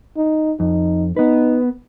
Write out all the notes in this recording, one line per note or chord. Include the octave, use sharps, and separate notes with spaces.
D#4
F2 D#4
B3 D#4 B4